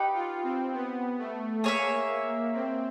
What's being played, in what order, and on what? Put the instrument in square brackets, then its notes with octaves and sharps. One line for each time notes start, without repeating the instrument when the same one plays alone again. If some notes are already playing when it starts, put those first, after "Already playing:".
Already playing: [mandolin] D#4 G4 B4
[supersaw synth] F4
C4
B3
A3
[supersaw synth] A#3 [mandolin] G#4 C#5 E5
[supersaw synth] C4